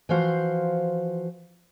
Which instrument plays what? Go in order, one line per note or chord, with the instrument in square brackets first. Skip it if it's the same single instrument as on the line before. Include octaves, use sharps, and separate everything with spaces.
[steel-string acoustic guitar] E3 F3 F#4 C5 F5